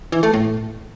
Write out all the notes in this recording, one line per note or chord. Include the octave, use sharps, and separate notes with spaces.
E3
A3
A2